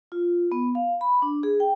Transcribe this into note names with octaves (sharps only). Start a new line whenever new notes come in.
F4
B3
F5
B5
D4
G#4
G5